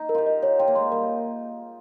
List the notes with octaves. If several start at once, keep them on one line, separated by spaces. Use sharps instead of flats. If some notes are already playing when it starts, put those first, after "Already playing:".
Already playing: D#4
A#4
F4 G4
D#5
G4 C#5
F4 G5
A#3
G#3 C6
G3 A#4